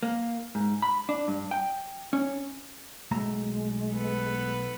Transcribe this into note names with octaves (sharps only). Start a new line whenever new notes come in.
A#3
G#2
B5
D4
G2
G5
C#4
B1 G#3 A3 A#5
B3 A4 B4